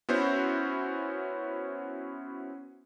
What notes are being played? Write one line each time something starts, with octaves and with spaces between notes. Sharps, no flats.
B3 C#4 E4 F#4 C5